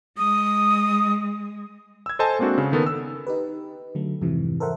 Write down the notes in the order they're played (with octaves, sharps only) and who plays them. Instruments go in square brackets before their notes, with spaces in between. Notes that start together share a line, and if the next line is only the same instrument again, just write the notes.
[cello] G#3 [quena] D#6
[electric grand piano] E6 G#6
A4 C5 D#5 G#5 A5
G#3 A#3 C4 D4 F#4
C#3
D#3 B3 A4 A#4
E6
[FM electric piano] D#4 G4 B4
D3 F#3 A3
F2 G#2 C3 E3
A4 A#4 C5 E5 F#5